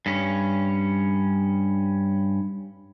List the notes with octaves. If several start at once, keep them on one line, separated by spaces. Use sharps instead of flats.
G2 C#4